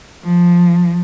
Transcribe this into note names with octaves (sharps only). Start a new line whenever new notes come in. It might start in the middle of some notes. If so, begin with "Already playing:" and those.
F3